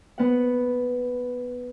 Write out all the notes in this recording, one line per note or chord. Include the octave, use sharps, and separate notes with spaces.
B3 F#5